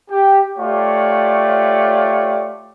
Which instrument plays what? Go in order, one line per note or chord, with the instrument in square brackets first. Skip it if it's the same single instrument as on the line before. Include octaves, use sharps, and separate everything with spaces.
[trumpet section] G4
A3 F4 G4 C#5 D5